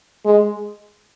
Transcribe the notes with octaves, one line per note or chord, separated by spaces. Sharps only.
G#3